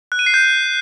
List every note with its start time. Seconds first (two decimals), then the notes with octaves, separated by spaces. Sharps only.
0.12 F#6
0.19 D#7
0.26 C7
0.34 G6